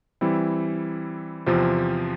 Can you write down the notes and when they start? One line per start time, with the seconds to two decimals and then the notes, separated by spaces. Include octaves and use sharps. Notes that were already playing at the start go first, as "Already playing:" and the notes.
0.21 E3 G3 C4 E4
1.46 E2 C3 F3 C4 F4